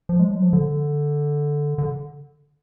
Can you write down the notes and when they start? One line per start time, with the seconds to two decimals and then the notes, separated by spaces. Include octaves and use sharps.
0.09 F3
0.19 G#3
0.31 F#3
0.42 F3
0.53 D3
1.78 D3